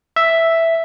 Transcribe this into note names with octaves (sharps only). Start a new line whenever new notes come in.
E5